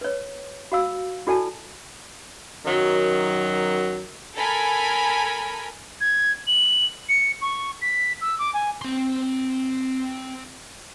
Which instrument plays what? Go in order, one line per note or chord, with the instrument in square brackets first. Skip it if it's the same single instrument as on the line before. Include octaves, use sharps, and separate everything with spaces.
[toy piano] B4 C#5
F#4 F5 E6
E4 F#4 A4 D5 G#5 A5
[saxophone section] F#2 D#3 F#3
[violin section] A4 A#4 G#5 B5
[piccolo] G#6
F#7
C#7
C#6
B6
E6
D6
G#5
[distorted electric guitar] C4 C6